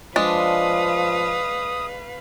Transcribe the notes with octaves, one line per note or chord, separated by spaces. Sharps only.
F3 G#3 D4 B4 F5 D#6